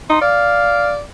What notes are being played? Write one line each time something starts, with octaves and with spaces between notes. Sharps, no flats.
D#4 C6
D5 F5